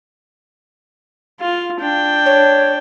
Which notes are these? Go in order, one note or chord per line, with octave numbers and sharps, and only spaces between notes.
F4
D4 G5
C#5